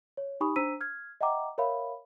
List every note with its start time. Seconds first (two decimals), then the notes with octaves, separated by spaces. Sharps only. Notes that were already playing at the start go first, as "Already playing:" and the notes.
0.17 C#5
0.41 D#4 G4 G#5 B5 C#6 D#6
0.56 D4 C5 A#5 E6 B6 D#7
0.81 F6 G#6
1.21 D#5 E5 F#5 G5 A#5 D6
1.58 A#4 C#5 E5 F5 B5